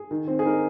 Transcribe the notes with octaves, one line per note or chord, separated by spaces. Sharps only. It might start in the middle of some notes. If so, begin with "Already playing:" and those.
Already playing: G#4
D#3
C4
G#4
D#4 A#4